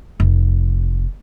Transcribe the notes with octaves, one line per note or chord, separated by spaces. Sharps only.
F1